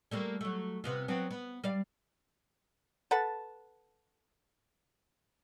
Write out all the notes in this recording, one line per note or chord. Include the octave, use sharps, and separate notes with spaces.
G3 A3 A#3
F#3 A3
C3 B3 F4
F#3 B3 C4
B3
G3 D5 F5
A4 B4 F#5 A5